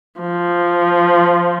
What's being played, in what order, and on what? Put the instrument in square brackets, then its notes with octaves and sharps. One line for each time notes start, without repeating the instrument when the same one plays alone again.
[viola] F3